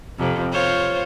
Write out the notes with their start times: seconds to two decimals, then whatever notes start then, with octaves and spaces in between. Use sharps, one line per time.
0.18 F2 C3
0.52 F4 C5 C#5